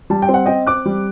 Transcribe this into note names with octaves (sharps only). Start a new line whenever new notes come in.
G3 A5
G5
C4
F#5
C4 D#5 G5
C4 D6 F#6
G3